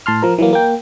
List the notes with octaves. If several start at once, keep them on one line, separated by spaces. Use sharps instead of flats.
A2 A5 C6 F6
F3 A#4
E3 F#3 A#3
A#3 G5